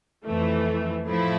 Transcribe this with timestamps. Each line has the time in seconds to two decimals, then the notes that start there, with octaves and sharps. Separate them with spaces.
0.25 F2 E3 A3
1.07 A2 F3 A3 E4